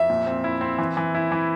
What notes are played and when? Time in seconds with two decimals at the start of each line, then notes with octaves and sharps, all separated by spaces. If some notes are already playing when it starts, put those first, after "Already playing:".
Already playing: F2 E5
0.10 A#2
0.27 C4
0.44 E4
0.61 C4
0.78 E3
0.97 E3
1.15 E4
1.32 E3